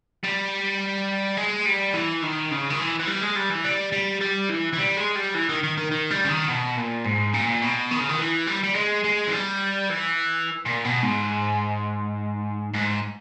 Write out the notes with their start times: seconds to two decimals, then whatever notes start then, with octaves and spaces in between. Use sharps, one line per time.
0.24 G3
1.37 G#3
1.66 G3
1.93 E3
2.22 D#3
2.51 C#3
2.70 D#3
2.79 E3
3.00 E3
3.08 G3
3.22 G#3
3.36 G3
3.50 E3
3.64 G3
3.92 G3
4.21 G3
4.50 E3
4.73 E3
4.78 G3
4.97 G#3
5.16 G3
5.34 E3
5.49 D#3
5.63 D#3
5.77 D#3
5.91 D#3
6.11 G3
6.24 C#3
6.30 D#3
6.48 B2
6.77 A#2
7.05 G#2
7.34 A#2
7.62 B2
7.91 D#3
8.00 C#3
8.09 D#3
8.19 E3
8.47 G3
8.64 G3
8.76 G#3
9.04 G#3
9.27 E3
9.33 G3
9.90 E3
10.65 A#2
10.84 B2
11.03 G#2
12.74 G#2